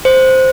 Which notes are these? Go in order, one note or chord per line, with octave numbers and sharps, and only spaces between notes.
C5